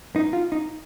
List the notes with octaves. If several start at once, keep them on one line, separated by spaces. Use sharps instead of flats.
D#4
F4
D#4